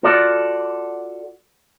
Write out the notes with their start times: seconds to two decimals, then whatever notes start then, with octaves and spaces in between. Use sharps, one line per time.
0.03 F4 F#4 A4 D5